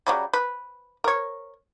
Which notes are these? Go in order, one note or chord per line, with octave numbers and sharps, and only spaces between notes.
C#3 F#3 G3
B4
A#4 C#5